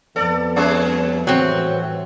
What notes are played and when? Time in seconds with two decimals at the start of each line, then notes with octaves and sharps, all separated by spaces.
0.16 F2 B3 A4 D5
0.56 G3 A3 C#4
1.27 A2 E3 F#3 C4